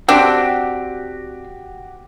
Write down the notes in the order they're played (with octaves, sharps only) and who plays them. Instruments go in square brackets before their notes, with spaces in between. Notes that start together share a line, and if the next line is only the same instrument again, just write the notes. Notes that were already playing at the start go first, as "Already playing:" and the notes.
[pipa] C4 D4 [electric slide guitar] F#4 G4